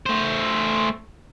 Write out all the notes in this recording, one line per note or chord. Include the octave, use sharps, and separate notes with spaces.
A3 C5